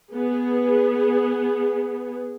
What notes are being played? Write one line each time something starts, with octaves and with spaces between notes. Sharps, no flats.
B3 G#4